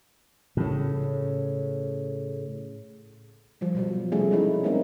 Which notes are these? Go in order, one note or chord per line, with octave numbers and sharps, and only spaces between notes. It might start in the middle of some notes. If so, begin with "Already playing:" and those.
A2 C#3
F3 G3
B2 F#3 G3
C3 F3 G3 A3 C#4 G#4
G3 G#3 C#4 D#4 E4
A#3 C4 C#4 D#4 E4